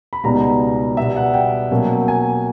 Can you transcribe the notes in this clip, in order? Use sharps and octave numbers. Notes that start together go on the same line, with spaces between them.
B5
C#2 B2 G3 B3 D#4 A#5
B2 G3 B3 E5
F#5
G5
B2 F#3 A#3 C#4
G#5